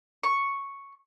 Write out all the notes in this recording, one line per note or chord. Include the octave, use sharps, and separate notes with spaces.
C#6